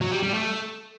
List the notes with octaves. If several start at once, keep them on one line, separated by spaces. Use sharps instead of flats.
F#3
G3
G3
A3